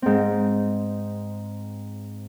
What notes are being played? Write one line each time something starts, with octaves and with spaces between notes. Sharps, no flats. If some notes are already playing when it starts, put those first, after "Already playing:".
G#2 C4